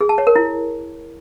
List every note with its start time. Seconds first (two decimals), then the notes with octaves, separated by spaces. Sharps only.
0.01 G#4
0.09 A5
0.18 C#5
0.27 A#4
0.36 E4